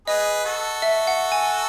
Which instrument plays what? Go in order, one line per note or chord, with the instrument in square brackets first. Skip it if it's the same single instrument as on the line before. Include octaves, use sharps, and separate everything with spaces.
[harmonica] G#4 B4 [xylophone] D#5
[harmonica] F#4 A4
[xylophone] E5
F#5
G#5